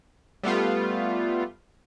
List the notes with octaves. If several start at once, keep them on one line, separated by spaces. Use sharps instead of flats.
G3 A3 B3 F4